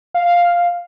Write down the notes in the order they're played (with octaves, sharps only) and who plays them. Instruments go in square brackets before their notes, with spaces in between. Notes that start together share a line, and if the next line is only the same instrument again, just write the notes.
[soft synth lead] F5